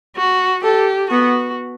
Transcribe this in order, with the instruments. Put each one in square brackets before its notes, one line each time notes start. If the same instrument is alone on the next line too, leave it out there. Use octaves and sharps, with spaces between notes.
[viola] F#4
[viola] G4 [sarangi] A4
[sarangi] B3 [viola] F#4